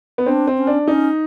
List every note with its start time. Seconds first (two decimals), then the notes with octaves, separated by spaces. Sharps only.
0.18 B3
0.26 C4 D4
0.47 C4
0.58 C#4
0.67 D4
0.87 C#4 D#4